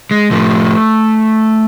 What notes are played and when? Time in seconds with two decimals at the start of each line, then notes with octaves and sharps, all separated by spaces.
0.11 G#3
0.31 A2 F3 A3